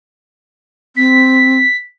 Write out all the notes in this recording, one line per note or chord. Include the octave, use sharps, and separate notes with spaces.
C4 B6